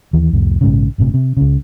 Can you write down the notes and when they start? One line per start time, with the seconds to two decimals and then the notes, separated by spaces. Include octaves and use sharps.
0.13 D#2 E3
0.33 C2 F2 A2
0.61 A#1 G#2 C#3
0.98 G1 A2 C3
1.14 C3
1.37 C#2 C#3